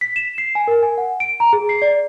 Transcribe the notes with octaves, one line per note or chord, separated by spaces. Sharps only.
B6
E7
C7
G#5
A#4
G#5
F#5
D7
A#5
G#4
C7
D5